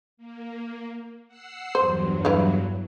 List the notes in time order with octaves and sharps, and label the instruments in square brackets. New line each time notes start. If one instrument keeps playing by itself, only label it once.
[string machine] A#3
F#5 E6 C7
[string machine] E2 G2 F#3 [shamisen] C5
[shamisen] E4 B4 F5